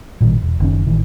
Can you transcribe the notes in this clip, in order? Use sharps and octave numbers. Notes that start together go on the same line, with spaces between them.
A1 A#2 D#3 G3
E1
F#1 D#3 C#4
A1 D#3 E3